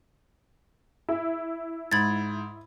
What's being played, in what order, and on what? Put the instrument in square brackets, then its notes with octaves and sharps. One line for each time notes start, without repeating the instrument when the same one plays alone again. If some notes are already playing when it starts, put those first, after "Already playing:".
[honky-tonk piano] E4
[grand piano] G#2 [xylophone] B5 G#6 A6